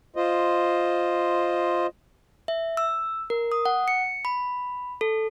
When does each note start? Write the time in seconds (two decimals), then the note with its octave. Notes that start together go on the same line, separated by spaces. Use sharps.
0.16 F4 C5 D#5
2.48 E5
2.77 E6
3.30 A#4
3.52 D#6
3.65 F#5
3.88 C#7
4.25 B5
5.01 A4